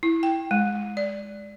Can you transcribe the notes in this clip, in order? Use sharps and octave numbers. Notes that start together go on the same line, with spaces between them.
E4
G5
G#3
D5